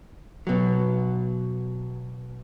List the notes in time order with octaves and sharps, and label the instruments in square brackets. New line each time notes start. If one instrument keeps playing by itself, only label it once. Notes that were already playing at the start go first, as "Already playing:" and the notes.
[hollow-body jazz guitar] B2 F#3